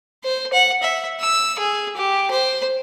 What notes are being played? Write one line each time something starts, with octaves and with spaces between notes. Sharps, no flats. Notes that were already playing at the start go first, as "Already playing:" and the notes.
C5
F#5
E5
E6
G#4
G4
C5